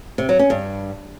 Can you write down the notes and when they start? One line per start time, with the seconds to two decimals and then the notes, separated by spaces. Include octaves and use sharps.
0.18 C3
0.29 F#3
0.39 C#4
0.50 G2